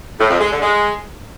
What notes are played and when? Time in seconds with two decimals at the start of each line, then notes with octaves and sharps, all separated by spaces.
0.19 A2
0.30 F2
0.40 G#3
0.51 D3
0.62 G#3